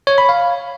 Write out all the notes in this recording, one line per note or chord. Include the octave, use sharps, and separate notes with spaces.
C#5
B5
F5